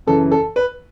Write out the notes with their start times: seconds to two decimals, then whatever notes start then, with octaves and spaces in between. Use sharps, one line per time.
0.07 F#2 C#3 E3 A4
0.32 A4
0.56 B4